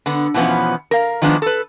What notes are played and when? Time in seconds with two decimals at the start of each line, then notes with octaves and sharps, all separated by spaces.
0.06 D3 B3
0.34 B2 E3 F3 B3 C#4
0.91 A#4 F5
1.22 D#3 F3 G#3 B3 D4
1.42 A4 B4